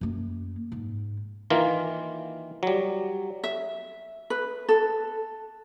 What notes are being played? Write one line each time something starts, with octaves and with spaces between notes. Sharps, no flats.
F#2 A#3
G#2
D#3 E3 A#3 F4
F#3 G3
E5
B4
A4